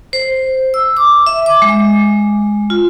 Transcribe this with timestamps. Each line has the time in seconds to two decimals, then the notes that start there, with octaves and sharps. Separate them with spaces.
0.13 C5
0.74 E6
0.97 D6
1.26 E5
1.46 D6
1.62 G#3
2.70 F4